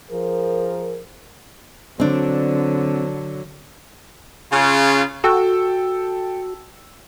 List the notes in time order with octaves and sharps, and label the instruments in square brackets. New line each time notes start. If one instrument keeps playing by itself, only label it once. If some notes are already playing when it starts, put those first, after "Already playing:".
[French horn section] F3 G#4 A#4
[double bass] D3 F#3 [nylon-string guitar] C4 D4
[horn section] C#3 F4
[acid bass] F#4 [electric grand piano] A4 G5 E6